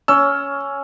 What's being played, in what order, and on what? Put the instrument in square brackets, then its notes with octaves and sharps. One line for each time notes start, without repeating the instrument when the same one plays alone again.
[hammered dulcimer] C#4 [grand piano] E6